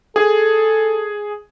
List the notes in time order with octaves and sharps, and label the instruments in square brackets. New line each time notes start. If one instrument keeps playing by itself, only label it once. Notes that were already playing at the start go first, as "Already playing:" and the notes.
[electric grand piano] G#4 [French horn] A4